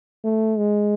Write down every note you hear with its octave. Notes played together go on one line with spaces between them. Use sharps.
A3
G#3